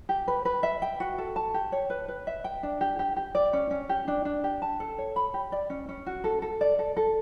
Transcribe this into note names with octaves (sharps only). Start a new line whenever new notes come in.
G4
B4
B4
E5
G5
F#4
A4
A5
G4
C#5
B4
B4
E5
G5
D4
G4
G4
G4
D5
C#4
C#4
G4
D4
D4
G4
A5
A4
C#5
B5
G4
D5
C#4
C#4
F#4
A4
A4
D5
A4
A4